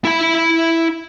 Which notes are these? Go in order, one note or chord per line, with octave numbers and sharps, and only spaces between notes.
E4 B5